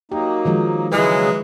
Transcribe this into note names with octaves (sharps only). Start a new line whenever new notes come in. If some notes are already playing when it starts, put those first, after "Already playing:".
F#3 A#3 D#4 G4
D#3 F3 G#3
C#3 E3 F#3 G#3 G#4 B4